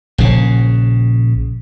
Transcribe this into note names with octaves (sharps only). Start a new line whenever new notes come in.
A#1 C#3